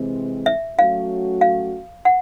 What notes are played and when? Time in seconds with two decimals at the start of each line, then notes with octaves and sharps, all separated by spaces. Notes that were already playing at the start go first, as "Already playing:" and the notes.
Already playing: C3 E3 G#3 C4
0.46 E5
0.78 F#3 A3 C#4 F#4 F5
1.41 F5
2.05 F#5